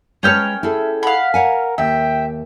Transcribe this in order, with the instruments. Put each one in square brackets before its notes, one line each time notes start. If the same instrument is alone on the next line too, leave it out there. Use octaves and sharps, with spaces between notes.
[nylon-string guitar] G#3 B4 C#5 [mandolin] C#4 G5 F6
[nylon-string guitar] E4 G#4 A4 [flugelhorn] E5
[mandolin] F5 B5 [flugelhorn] F#5
[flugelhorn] A#4 [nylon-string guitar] C#5 F#5 G#5
[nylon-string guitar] D#2 [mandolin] E5 [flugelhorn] G5